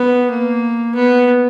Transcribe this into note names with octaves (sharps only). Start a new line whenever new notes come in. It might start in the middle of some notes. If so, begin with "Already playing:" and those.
Already playing: B3
A#3
B3